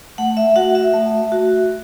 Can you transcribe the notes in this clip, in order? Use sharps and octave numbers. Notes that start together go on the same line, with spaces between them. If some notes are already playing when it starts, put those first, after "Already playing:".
A3 F#5
E5
F#4 F#5
E5
A3
F#4